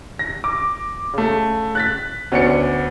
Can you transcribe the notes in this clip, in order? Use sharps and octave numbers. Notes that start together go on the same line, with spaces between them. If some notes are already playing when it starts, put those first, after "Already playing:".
A#6
D6
C#3 A3
F#6 A6 B6
D2 B3 C#4 D5 C#7